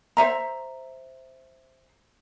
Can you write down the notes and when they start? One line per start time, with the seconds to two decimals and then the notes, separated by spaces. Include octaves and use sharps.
0.17 C5 E5 A#5